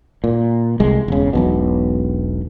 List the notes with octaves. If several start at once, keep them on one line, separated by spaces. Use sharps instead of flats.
A#2
C2 G#3
E1 C#3
E1 B1 B2